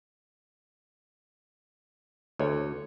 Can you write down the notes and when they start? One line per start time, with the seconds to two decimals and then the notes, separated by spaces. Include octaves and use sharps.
2.40 D2 A4 C#5